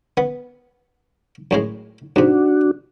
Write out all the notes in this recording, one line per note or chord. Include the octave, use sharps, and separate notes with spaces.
B3
F#2 A2 G#3
G#2 C3 D4 F#4